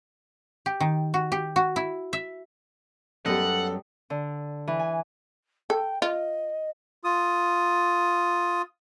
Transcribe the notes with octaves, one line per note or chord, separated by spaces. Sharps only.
G4
D#3
F#4
G4
F#4
E4
E5
F#2 F#3 G3 B3 A4 D#5 F#5
D3
E3
G#5
A4 G5
F4 D#5
F4 D#6